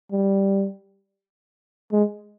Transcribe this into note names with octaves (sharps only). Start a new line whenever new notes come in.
G3
G#3